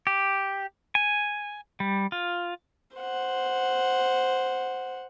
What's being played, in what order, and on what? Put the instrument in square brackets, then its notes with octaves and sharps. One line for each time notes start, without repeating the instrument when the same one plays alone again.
[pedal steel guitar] G4
G#5
G3
F4
[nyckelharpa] C5 F#5